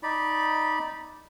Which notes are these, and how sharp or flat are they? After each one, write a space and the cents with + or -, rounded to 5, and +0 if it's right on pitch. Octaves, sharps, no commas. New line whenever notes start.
D#4 +0 D5 +0 B5 -15